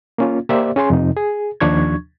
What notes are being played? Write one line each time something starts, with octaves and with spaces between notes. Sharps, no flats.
A#3 C#4 F4
A#3 G4 C5 D5 E5
C#4 G#4 G#5 C6
F2 C3 D#4
G#4
D#2 F3 D4 C#6 G#6